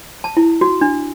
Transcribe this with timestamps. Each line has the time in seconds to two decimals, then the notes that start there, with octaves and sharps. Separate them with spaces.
0.24 A5
0.37 E4
0.61 F#4
0.81 D4